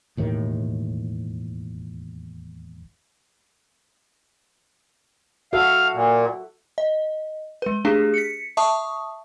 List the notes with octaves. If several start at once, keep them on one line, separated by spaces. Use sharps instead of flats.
E1 D#2 A2 D#3
F#4 A4 E5 F5
A#2
D#5
G#3 B4
A3 D4 G4 G#4
B6 C#7
E5 A5 C#6 D#6